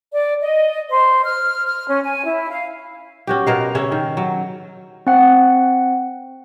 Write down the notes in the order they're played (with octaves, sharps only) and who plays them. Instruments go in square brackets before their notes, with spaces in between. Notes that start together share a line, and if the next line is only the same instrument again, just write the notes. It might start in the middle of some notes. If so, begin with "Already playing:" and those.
[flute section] D5
D#5
C5
F6
F6
C#4
G#5
E4
F5
[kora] C#4 F#4 G4
B2 A#4 F5
C#3 C#4 E5
D#3
F#3
[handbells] C4 F#5